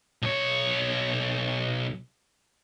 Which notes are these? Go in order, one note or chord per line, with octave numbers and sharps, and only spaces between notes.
B1 C#5